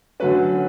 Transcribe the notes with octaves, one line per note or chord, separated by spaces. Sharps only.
D3 F#3 A3 C#4 B4